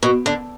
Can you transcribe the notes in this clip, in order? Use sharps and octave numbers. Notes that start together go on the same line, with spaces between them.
B2
D3